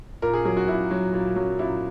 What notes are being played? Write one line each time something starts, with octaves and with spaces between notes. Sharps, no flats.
A#2 A#4
G#4
F#3 G#4
F#4
A#2 E4
F#3
A#2
F#3
A#2 E4